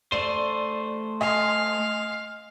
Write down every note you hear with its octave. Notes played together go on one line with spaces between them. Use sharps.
A3 C5 D5 D#7
D#5 F5 G#5 C6